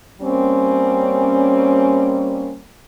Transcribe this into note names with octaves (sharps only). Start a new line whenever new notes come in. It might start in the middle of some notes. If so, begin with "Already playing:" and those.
G3 A#3 C4 C#4